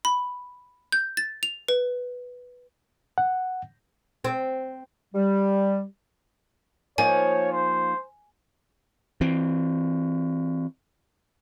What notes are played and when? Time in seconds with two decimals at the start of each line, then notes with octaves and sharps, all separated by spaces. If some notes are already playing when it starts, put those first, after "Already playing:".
0.05 B5
0.92 G6
1.17 A6
1.43 F7
1.68 B4
3.18 F#5
4.24 C4
5.14 G3
6.98 F3 A#3 D#4 C#5 G#5
7.52 C5
9.21 E3 C4